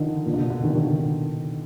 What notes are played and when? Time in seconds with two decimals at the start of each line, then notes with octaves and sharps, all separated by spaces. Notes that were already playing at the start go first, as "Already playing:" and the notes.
Already playing: D3 D#3 F3 D#4
0.25 A#2
0.34 D3
0.38 B2
0.50 D3
0.63 D#3
0.71 D3
0.75 D#3
0.88 D3